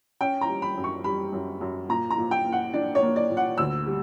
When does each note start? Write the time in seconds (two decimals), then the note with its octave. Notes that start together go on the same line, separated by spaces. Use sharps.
0.21 C#4 G5
0.41 A#5
0.49 G3
0.62 B5
0.77 F#2
0.84 C#6
1.04 G3 B5
1.32 F#2
1.61 F#2
1.89 A#2 A#5
2.11 A#5
2.18 A#2
2.31 G5
2.45 A#3
2.52 F#5
2.74 D4 D5
2.95 C#5
3.02 A#3
3.16 D5
3.30 A#2
3.37 F#5
3.58 D2 E6
3.86 G3